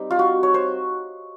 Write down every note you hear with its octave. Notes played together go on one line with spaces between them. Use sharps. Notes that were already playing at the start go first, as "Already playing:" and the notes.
Already playing: G3 C4 D#4
F4
F#4
C#5
C5